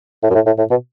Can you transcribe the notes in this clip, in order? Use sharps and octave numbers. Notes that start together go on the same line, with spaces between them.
A2
F#2
A2
A2
A2
B2